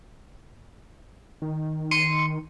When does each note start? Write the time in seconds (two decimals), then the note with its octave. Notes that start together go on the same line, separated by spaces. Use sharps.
1.42 D#3
1.91 C6 C#7 D#7